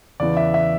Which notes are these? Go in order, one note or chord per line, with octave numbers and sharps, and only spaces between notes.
E2 C#3 E3 B3 D5
E5
E5